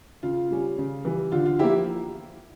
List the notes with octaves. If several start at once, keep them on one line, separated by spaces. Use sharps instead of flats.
C#3 F4
G3 C#4
C#3
E3 G3
D3 F4
F4
F3 A#3 E4 G4